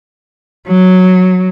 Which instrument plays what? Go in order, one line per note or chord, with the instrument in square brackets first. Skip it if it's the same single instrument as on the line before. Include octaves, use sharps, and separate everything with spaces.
[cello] F#3